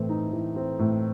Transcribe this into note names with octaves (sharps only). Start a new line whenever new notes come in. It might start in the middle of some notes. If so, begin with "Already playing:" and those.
Already playing: A2 E3 C4
D#4
E3
C4
A2